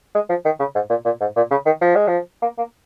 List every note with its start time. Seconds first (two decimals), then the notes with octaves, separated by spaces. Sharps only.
0.15 G#3
0.29 F3
0.45 D#3
0.60 C#3
0.75 G#2
0.90 A#2
1.05 A#2
1.21 G#2
1.36 A#2
1.51 C#3
1.66 D#3
1.81 F3
1.95 G#3
2.07 F3
2.42 A#3
2.58 A#3